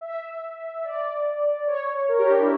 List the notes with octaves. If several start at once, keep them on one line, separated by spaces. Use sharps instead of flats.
E5
D5
C#5
A#4
G4
D4
E4